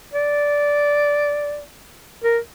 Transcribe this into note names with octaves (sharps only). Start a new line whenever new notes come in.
D5
A#4